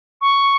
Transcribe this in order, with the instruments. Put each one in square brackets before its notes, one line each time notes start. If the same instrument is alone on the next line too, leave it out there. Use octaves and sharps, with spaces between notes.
[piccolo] C#6